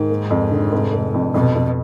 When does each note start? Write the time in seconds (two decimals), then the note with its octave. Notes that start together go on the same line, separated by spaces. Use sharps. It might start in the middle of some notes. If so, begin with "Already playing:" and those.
Already playing: G#2 D#3
0.10 A#3
0.30 F2
0.51 D3
0.72 F1
0.93 F1
1.14 F2
1.34 F2 B2
1.55 F2